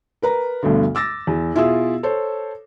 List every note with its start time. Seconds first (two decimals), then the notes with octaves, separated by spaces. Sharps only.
0.22 A#4 B4 A#5
0.63 D2 G2 B2 D3
0.95 D6 E6 A6 A#6
1.27 E2
1.55 B2 E4 F4 G#4 E6
2.03 A4 C5 C#5